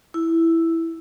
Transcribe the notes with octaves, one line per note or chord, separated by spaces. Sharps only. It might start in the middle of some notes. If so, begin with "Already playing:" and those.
E4